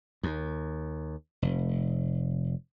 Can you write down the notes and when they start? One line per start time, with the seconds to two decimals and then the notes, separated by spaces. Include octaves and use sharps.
0.23 D#2
1.42 F1